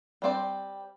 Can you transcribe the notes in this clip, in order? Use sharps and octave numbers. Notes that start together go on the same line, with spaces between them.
G3 C4 G4 D5